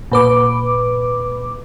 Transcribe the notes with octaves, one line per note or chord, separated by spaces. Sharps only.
A#2 B4 D6